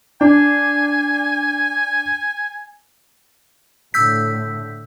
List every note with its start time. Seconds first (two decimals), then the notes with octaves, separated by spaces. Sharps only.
0.21 D4 G#5
3.94 A2 D3 A3 E6 G6 B6